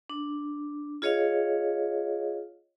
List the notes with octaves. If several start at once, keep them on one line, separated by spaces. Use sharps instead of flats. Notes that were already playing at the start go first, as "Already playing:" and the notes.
D4
F4 G#4 C#5 D#5 F5